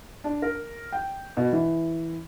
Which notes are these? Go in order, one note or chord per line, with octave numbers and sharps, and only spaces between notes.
D4
A#4
G5
B2
E3